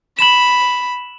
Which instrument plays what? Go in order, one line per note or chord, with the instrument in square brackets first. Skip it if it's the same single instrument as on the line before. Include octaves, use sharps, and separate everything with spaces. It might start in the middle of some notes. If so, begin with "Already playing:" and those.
[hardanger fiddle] B5 [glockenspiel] E7 F#7